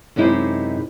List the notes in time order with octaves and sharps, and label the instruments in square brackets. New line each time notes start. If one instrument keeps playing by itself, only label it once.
[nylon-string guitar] F#2 C3 G#3 D#4 E4